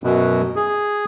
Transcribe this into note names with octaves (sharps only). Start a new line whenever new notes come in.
F#2 B2
G#4